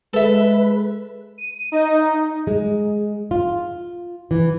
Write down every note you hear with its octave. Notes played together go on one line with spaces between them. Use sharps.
G#3 A4 B4 E5
D#7
D#4
G#3
F4
E3